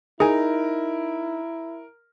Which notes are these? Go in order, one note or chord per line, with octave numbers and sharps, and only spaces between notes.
D#4 E4 G#4 A#4 G#5